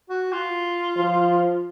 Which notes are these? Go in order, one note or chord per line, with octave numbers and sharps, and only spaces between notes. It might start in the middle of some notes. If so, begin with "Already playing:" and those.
F#4
F4
F3